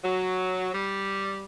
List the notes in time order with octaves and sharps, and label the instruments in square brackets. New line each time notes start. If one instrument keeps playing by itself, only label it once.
[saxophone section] F#3
G3